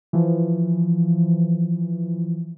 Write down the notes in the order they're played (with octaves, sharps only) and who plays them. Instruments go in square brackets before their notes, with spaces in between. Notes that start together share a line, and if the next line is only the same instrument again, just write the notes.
[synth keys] E3 F3